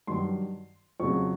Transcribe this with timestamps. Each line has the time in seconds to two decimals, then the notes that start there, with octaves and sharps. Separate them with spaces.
0.07 G2 D#3 F#3 C6
1.00 F2 C#3 F#3 C#6